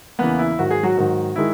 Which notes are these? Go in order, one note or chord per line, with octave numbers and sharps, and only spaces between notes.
E2 C#3 E3 A#3 B3 B4
E4
G#2 D#3 F#3 F#4
G#4
F#3 F#4
G#2 D#3 F#3
D#3 G#3 E4